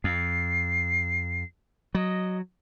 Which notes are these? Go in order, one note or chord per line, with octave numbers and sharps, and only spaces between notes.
F2 C7
F#3 D#5